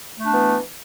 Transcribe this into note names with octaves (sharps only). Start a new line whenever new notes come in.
E3 A3 B3 D4